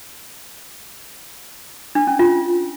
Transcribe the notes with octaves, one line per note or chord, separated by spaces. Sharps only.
D4
C#4
F4